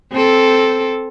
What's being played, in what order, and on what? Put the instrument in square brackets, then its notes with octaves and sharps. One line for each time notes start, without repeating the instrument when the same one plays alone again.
[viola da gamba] C4 A4